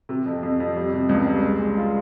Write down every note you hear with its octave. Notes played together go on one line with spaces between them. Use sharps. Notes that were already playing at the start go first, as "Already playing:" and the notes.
C3
F2
F2
F2
G3
C3
C#2
G3
G#3
G#3
F4